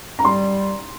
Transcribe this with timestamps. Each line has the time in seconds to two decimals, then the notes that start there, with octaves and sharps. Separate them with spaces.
0.19 A#5
0.24 G3 C6